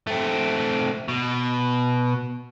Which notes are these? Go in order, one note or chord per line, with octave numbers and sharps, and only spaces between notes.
A3 C4
B2